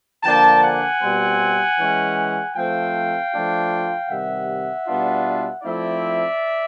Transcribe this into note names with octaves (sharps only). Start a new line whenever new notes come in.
D3 F3 A#3 D4 G5 A5
F#5 G#5
B2 G3 C4
E3 G#3 C#4
F3 A3 C4 F5 G5
F3 A3 D4 F4
C3 D#3 G3 E5 F#5
B2 G3 B3 D4 F4
F3 A3 C4 E4 D5 E5